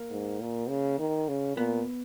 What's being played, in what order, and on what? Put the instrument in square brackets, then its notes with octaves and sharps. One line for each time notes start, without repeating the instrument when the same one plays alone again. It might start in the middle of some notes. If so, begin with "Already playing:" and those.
Already playing: [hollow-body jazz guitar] A#3
[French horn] G#2
A#2
C#3
D#3
C#3
[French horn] A#2 [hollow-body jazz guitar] B3